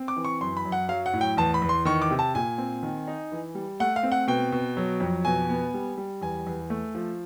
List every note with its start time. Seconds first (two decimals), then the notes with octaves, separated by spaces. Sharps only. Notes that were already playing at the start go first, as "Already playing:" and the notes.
Already playing: C4
0.08 D6
0.16 E3
0.25 C#6
0.41 F#2 C6
0.57 B5
0.65 F#2
0.72 F#5
0.89 F#3 F5
1.06 F#5
1.13 A2
1.21 G5
1.37 E2 A5
1.54 B5
1.62 E2
1.69 C6
1.85 D#3 C#6
2.02 D6
2.11 C3
2.19 A5
2.35 A#2 G#5
2.58 C4
2.83 D#3
3.08 D#4
3.32 E3
3.55 G3
3.80 A3 F#5
3.96 F5
4.03 C4
4.12 F#5
4.27 B2 G5
4.52 B2
4.77 F#3
5.00 F2
5.25 B2 G#5
5.49 B3
5.74 G3
5.98 G3
6.21 E2 G#5
6.47 E2
6.70 A3
6.95 F3